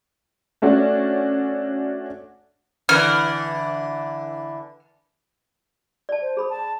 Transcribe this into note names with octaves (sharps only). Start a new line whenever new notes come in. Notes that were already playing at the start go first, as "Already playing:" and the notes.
A3 C#4 D4 F#4
D3 E3 F6
D5 A5
C5
G#4 B5 D#6
A5